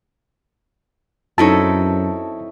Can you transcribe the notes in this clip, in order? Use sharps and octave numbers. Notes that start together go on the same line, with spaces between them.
F#2 C4 D#4 E4 A4 C#5 A5